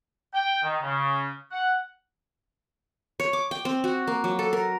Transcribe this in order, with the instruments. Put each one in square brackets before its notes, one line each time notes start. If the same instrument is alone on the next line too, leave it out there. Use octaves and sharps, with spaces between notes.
[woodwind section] G5
D#3
C#3
F#5
[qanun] C#5
D6
G5
C4
F#4
A#3
F#3
A4
A#4